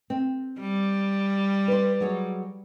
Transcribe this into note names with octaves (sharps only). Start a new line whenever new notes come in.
C4
G3
B4 C5
F#3 G#4 C#5